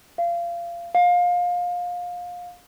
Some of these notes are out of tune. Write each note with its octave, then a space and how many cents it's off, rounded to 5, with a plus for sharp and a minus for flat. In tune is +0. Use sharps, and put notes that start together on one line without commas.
F5 -25
F5 +25